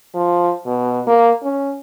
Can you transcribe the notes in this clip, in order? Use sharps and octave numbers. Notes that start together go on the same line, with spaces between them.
F3
B2
A#3
C#4